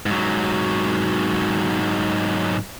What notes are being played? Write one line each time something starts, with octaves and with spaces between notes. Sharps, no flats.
G#2 F#3